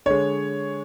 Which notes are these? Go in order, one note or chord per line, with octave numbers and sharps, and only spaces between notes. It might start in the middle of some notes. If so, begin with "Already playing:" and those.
D3 G#3 C#5